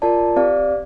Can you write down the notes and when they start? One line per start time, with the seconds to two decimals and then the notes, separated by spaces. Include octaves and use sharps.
0.02 F4 A#4 D5 A5
0.36 C4 G4 D5 F5